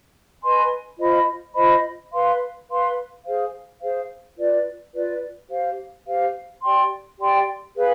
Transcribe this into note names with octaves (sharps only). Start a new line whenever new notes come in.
B4 D#5 G#5 C6
F4 C5 D#5 B5
F4 C5 D#5 B5
B4 F5 C6
B4 F5 C6
G#4 C5 F5
G#4 C5 F5
F4 B4 D5
F4 B4 D5
G4 C5 F5
G4 C5 F5
G4 D5 G5 C6
G4 D5 G5 C6
G#4 B4 F5